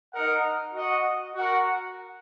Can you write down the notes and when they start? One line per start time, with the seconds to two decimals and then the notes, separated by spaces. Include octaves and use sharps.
0.13 D#4 A#4 D#5 F#5
0.74 F#4 D#5 F#5
1.36 F#4 A#4 F#5